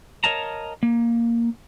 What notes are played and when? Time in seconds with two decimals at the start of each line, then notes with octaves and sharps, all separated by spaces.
0.24 A#4 C#5 D#5 F5 A5 A#5
0.83 A#3